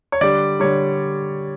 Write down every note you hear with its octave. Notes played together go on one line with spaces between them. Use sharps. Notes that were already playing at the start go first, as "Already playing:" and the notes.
C#5
D3 G3 D5
D3 G3 C#5